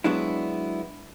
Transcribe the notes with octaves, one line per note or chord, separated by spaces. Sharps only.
F#3 G#3 B3 D4 E4